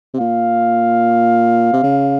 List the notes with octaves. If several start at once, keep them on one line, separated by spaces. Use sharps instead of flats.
C3
A#2 F5
C3
C#3